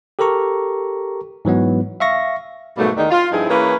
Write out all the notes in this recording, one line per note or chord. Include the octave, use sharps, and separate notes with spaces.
G4 A4 A#4 A#5 C#6
G#2 E3 F#3 B3
E5 F5 C#6 A#6
G#2 B2 F#3 G3 A3 A#3
E2 D#3 G#3 A3 D#4 D5
F4
G2 F3 C4 D#4 E4 G#4
E3 A#3 C#4 G#4 B4 C#5